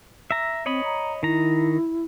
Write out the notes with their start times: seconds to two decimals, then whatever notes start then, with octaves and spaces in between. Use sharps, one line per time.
0.31 E5 A#5
0.66 C4 C#5 D#5 B5
0.84 A#5
1.23 D#3 E4 A#5